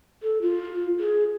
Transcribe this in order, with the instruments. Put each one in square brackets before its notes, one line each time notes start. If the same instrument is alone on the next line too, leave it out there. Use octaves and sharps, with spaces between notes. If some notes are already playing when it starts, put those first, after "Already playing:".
[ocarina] A4
F4
G#4